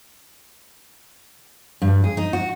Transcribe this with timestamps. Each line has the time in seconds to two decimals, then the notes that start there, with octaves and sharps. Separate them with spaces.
1.82 G2
2.04 G#4
2.17 D#4
2.33 F#4